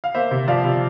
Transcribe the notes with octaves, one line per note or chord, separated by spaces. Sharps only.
F5
A#3 C5 E5
C3
F3 D5 F5
C3